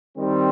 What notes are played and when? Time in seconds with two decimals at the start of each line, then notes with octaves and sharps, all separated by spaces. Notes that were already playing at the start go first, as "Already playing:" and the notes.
0.17 D#3 G3 C4